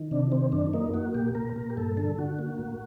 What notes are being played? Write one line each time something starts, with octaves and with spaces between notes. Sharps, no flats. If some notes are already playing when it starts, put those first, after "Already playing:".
Already playing: D#3
C3 D4
D#3 C4
F#2 D4
A#3 D#4
A#3 F#4
A#2 G4
A#2 A#4
A#2 A#4
G4
G2 A4
D3 A4
D3 F#4
A#3
A2